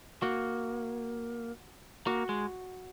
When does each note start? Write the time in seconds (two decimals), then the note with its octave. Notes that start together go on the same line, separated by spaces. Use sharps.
0.22 A#3 F#4
2.06 A#3 F#4
2.29 G#3